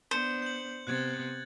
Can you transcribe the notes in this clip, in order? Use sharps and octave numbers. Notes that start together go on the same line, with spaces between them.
B3 D4 C5 C#7
G6 F#7
C3 B3 F#6 G#6 A6